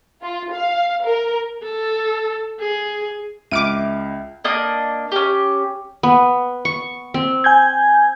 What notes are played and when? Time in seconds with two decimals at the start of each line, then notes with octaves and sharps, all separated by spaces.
0.22 F4
0.53 F5
1.03 A#4
1.63 A4
2.60 G#4
3.51 C#2 E5 D6 F6 D7 D#7
4.44 A#3 D4 D#5 D#6
5.12 C#4 G4
6.03 B3
6.65 C#6
7.14 C4
7.44 G#5 G6 G#6